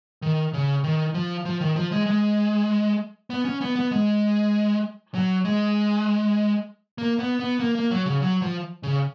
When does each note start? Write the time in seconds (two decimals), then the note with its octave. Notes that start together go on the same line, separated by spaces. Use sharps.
0.22 D#3
0.53 C#3
0.84 D#3
1.14 F3
1.45 F3
1.61 D#3
1.76 F3
1.92 G#3
2.07 G#3
3.30 B3
3.45 C#4
3.61 B3
3.76 B3
3.91 G#3
5.15 F#3
5.45 G#3
6.98 A#3
7.19 B3
7.40 B3
7.60 A#3
7.75 A#3
7.91 F#3
8.06 C#3
8.22 F#3
8.42 F3
8.83 C#3